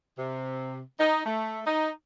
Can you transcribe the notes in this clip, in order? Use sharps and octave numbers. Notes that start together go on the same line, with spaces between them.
C3
D#4
A3
D#4